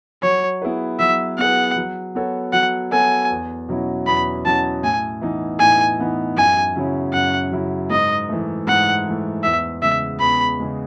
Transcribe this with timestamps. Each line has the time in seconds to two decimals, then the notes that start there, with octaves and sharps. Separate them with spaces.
0.23 F#3 C#5
0.62 B3 E4 G#4 B4
0.99 F#3 E5
1.38 B3 E4 G#4 B4 F#5
1.76 F#3
2.15 B3 F#4 A4 C#5
2.53 F#3 F#5
2.91 B3 F#4 A4 C#5 G#5
3.30 E2
3.69 B2 F#3 C#4 E4
4.07 E2 B5
4.45 B2 F#3 C#4 E4 A5
4.83 A2 G#5
5.21 E3 B3 D#4
5.60 A2 G#5
5.99 E3 B3 D#4
6.37 F#2 G#5
6.76 C#3 F#3 C#4 E4
7.13 F#2 F#5
7.52 C#3 F#3 C#4 E4
7.90 G#2 D#5
8.29 E3 A3
8.67 G#2 F#5
9.06 E3 A3
9.43 E2 E5
9.82 C#3 G#3 E5
10.20 E2 B5
10.59 C#3 G#3